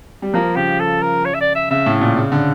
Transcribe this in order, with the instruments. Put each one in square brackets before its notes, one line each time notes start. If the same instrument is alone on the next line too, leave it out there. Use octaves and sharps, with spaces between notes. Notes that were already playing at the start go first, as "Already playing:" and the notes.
[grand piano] G3
[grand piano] F3 [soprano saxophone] A#3
[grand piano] C#3 [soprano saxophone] G4
[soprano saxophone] A4
A#4
C#5
E5
D5
E5
[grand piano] C#3 [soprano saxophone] E5
[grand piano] A2
A#2
C#3
D3